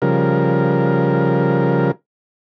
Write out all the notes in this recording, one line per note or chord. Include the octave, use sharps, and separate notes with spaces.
C#3 F3 G3 A#4